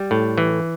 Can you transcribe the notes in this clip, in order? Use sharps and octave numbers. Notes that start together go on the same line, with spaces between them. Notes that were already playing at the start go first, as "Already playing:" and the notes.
Already playing: G3
A2
E3